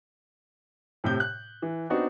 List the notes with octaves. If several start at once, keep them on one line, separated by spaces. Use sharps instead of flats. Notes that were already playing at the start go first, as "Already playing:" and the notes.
A2 C3 G6
F#6
E3
B3 C4 D4 D#4 F#4